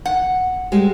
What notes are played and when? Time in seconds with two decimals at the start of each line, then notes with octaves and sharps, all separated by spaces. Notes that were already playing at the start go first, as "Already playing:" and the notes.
0.06 F#5
0.72 G3 G#3